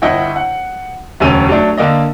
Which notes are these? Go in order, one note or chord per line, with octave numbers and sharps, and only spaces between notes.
G1 E4 D#5 F#5 G5
F#5
E1 D2 F#3 C#4 E6 D#7
F#3 A3 D4 D5
D3 A#3 D5 D#5